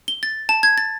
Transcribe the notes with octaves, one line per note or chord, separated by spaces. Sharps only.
G7
A6
A5
G#6
A6